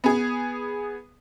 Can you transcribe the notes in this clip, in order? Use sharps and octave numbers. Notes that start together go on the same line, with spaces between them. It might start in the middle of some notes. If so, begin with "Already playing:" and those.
B3 G#4